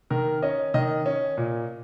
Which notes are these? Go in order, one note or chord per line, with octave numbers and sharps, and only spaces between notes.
D#3 A#4
C#4 D#5
D#3 D#5
C#4
A#2